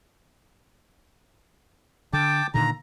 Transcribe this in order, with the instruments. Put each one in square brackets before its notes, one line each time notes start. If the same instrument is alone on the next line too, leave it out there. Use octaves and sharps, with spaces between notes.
[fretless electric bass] D3 [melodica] G5 A5 D6
[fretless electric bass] A#2 D3 D#3 [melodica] A#5